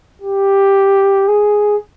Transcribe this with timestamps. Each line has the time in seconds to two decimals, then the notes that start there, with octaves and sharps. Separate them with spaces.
0.22 G4
1.28 G#4